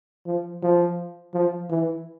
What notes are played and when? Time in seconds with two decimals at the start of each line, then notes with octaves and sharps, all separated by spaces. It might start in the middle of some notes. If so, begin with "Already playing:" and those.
0.26 F3
0.63 F3
1.34 F3
1.70 E3